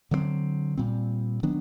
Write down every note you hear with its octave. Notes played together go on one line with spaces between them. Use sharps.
D3 F#3 A3 C4
A#2 G3 C4
D#3 F#3 B3 D4